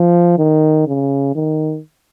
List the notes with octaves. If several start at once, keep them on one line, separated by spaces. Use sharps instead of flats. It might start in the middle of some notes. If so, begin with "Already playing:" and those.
Already playing: F3
D#3
C#3
D#3